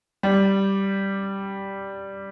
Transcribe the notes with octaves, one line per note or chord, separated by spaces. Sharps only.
G3